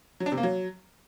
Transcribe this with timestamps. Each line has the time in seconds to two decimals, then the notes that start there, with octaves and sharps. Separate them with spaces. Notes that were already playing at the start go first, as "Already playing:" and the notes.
0.20 F#3
0.26 D4
0.32 C3
0.38 A#3
0.43 F#3